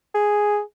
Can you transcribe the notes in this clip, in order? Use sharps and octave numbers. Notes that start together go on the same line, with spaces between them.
G#4